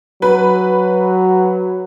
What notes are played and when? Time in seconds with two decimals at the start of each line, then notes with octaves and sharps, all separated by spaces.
0.22 F#3 B4